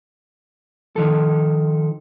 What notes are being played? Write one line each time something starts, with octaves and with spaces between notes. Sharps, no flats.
D#3 F3 A4